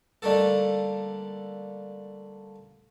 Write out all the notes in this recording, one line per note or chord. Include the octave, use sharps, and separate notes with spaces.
D3 G3 A3 A#3 A4